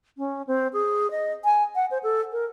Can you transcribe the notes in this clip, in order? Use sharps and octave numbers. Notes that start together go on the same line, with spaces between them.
C#4
C4
G#4
D#5
G#5
F#5
C5
A4
A#4